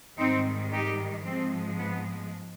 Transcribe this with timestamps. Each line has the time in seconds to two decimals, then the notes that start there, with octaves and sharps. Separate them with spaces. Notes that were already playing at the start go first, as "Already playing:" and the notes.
0.17 G#2 D#3 G3 C4 D#4
0.71 D#4 G4
1.24 G#2 F3 G#3 C4
1.78 B3